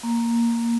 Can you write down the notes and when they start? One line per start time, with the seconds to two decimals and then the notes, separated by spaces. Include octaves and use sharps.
0.03 A#3